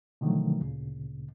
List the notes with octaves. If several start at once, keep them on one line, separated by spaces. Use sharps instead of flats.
B2 D3 D#3 F3 F#3 A3
D2 A#2 C#3